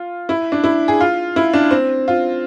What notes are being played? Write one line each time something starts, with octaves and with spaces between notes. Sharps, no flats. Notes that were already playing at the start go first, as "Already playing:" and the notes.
Already playing: F4
E4
D4
E4
G#4
F4
E4
D4
C4
F4